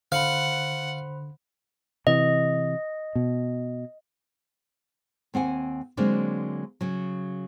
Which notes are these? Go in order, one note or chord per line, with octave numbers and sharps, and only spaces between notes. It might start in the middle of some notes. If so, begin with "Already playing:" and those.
D3 C5 F5 F#5 B5
C3 E3 D#5
B2
D#2 C4 F#5 G#5
D3 F#3 G#3 A#3 C4 D4
C#3 F#3